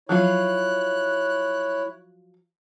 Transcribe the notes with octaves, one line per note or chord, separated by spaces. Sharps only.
F3 F#3 E4 F4 C#5 F#6